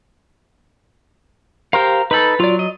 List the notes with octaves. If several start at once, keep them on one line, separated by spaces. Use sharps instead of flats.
G4 A#4 C5 F5
D#4 A4 B4 B5
F#3 F4 D5
D#5